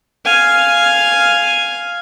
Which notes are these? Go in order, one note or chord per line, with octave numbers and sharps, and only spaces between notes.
F5 G#5